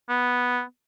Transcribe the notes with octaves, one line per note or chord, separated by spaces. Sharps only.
B3